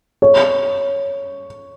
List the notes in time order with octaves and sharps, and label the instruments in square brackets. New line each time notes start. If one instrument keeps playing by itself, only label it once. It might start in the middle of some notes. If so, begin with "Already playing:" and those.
[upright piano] C#5